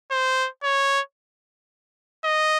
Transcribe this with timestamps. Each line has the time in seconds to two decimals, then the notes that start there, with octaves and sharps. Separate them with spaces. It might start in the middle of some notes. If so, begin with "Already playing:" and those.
0.11 C5
0.63 C#5
2.24 D#5